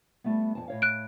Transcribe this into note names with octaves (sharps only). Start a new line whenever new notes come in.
G3 A3 B3
F2 F3 A5
A2 C#5 F5
F#6 D7